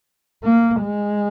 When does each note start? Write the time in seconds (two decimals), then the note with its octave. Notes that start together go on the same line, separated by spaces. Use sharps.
0.44 A#3
0.82 G#3